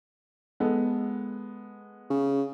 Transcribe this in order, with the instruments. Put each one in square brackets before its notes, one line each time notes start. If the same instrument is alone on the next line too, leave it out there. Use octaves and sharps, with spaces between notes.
[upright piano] G#3 B3 A4
[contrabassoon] C#3